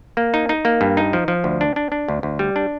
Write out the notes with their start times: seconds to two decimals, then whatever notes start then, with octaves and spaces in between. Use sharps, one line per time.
0.17 A#3
0.34 D#4
0.49 D#4
0.65 A#3
0.81 G2
0.97 D#4
1.13 F3
1.28 F3
1.44 D2
1.61 D4
1.76 D4
1.92 D4
2.08 D2
2.23 D2
2.39 G3
2.56 D4